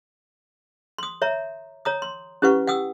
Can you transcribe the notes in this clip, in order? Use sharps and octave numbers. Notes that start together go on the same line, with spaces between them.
C6 D#6
C#5 E5 A#5
C#5 A#5 D#6
C6
C#4 E4 G4 B4 F#5 C#6
F#5 G5 D#6 E6